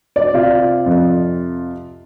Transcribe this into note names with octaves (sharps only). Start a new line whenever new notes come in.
D5
C3 F4
F2